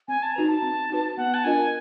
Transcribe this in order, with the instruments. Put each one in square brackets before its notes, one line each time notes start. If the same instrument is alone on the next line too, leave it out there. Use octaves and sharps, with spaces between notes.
[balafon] C4 [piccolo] G#5
[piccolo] A5
[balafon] D#4 F#4 B4 [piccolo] A#5
[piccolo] A5
[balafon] C4
D#4 F#4 B4
[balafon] B3 [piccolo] F#5
[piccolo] A5
[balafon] D4 F4 A#4 D#5 [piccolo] G#5